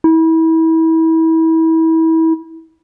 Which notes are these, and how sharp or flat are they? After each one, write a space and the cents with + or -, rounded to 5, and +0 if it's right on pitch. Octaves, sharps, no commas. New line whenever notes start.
E4 -30